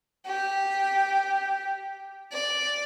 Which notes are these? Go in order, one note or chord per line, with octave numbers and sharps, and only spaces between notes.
G4
D5